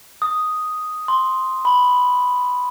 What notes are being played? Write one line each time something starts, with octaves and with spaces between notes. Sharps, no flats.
D#6
C6
B5